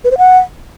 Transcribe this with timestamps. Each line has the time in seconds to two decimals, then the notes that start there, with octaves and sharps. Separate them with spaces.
0.04 B4
0.11 C5
0.18 F#5